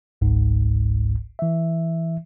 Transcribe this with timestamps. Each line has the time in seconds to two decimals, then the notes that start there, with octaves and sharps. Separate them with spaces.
0.21 G1 C#2 G#2
1.39 E3 E5